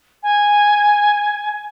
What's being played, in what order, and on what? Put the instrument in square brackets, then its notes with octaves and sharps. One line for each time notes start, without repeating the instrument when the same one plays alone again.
[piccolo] G#5